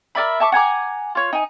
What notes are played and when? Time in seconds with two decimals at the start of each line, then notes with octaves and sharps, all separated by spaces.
0.15 A#4 D5 E5 B5
0.40 E5 A5 C#6 D6
0.52 F#5 G#5 A#5 D6
1.15 F4 C#5
1.33 D#4 G#5